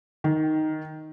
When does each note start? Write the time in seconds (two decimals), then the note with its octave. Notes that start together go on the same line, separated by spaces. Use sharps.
0.24 D#3